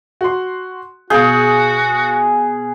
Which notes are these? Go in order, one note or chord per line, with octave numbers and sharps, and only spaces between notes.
F#4 C6
B2 F#4 G#4 F5 G6